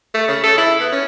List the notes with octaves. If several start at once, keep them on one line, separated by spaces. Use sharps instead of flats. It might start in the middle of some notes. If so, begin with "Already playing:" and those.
A3
C#3
A4
E4
B3
C#4